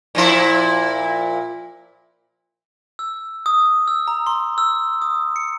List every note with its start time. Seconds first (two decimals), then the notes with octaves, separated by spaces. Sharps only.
0.15 A#2 F3 E4
2.99 E6
3.46 D#6
3.88 E6
4.08 A#5
4.27 C6
4.58 E6
5.02 D#6
5.36 C#7